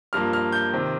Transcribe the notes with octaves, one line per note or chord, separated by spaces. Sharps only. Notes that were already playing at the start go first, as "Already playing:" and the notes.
G2 F3 A#3 F6
F6
G6
C3 D#3 C4